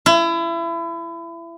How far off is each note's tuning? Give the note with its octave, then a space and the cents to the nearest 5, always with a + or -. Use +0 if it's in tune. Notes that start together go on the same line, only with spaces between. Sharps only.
E4 +30